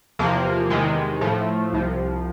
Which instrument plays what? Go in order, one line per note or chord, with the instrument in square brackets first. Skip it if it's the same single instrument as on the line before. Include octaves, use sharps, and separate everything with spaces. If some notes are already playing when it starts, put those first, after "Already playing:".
[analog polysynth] E2 C3 F3 A#3
E2 C3 D#3 G#3
A2 F3 A3
C2 C3 F3